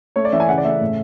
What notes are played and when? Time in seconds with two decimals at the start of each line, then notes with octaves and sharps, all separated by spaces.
0.16 A3 C#5
0.25 D5
0.33 E3 E5
0.40 G#5
0.49 C#3 F#5
0.58 D5
0.65 A3 E5
0.81 A2